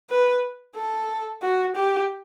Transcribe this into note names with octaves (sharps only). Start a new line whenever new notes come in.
B4
A4
F#4
G4